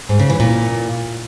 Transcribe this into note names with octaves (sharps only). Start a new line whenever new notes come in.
G#2
C#3
E3
A#2